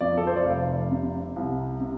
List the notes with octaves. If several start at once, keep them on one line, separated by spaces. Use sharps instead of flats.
F2 D5
A4
C5
D5
F1 F5
C3
C2
C3